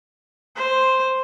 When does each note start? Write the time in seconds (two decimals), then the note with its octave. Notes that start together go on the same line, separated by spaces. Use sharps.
0.56 C5